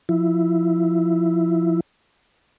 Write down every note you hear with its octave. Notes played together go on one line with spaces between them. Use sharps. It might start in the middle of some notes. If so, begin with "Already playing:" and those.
F3 E4